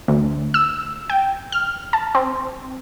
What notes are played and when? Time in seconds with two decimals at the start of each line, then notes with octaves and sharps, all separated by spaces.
0.08 D2
0.54 E6
1.10 G5
1.52 F6
1.93 A5
2.15 C4